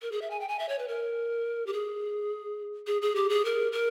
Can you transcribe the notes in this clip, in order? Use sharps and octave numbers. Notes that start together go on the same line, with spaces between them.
A#4
G#4
E5
G#5
G5
G#5
E5
C#5
B4
A#4
G4
G#4
G#4
G#4
G4
G#4
A#4
A#4